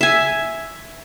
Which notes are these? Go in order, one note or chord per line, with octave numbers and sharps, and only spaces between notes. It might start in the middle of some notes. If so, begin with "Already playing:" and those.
E5 G#5